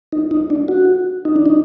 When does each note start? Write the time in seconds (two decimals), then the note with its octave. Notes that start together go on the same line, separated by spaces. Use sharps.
0.12 D#4
0.31 D#4
0.50 D4
0.68 F#4
1.25 D#4
1.36 D4
1.46 D#4